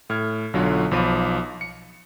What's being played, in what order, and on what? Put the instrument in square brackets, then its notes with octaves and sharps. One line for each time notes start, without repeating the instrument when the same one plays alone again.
[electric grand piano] A2 F6 G#6
B1 D3 F#3 F4 F#4
B1 F3 B5 D6 D#7
C#7